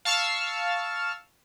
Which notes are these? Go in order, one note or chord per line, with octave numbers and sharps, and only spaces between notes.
F5 A5 C#6 E6 F6